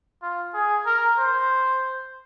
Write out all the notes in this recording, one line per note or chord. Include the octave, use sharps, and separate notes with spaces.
F4
G#4
A#4
C5